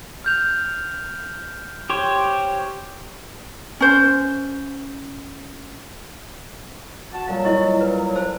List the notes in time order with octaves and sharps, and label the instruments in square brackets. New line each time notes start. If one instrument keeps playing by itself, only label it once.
[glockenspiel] F6 G6 F7
[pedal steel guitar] G4 C5 C#5
[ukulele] C#4 C5
[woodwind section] F#4 A5
[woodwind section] A#2 F#3 G3 [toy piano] F5
[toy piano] E4 D#5 C#6
B4
C5 A5 E6